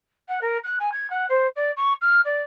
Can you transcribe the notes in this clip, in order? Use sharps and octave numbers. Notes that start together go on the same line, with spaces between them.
F#5
A#4
F#6
G#5
G#6
F#5
C5
D5
C#6
F6
D5